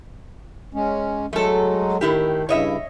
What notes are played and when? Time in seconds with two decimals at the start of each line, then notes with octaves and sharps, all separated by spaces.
0.74 G#3 C#4
1.33 F#3 G#3 A3 A4
2.01 A2 D#3 E4 G4
2.49 G2 C#3 E4 C#5 D#5 E5